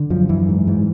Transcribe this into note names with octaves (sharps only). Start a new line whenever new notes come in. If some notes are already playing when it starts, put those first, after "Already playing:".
Already playing: D3
F#2 F3
F#2 E3
G#2
G#2